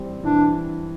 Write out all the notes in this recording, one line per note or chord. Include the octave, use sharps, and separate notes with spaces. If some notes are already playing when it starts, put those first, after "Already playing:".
Already playing: E3 G3 C4
E3 D4